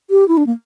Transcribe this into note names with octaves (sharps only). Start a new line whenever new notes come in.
G4
E4
D4
A#3